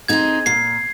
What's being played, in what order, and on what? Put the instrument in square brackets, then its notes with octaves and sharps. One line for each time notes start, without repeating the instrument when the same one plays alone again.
[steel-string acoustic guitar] C4 D#4 G#4 [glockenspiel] G#6
[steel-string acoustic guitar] A#2 [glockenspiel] C7